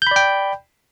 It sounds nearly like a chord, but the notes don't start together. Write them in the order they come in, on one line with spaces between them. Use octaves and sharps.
G6 B5 D5 G5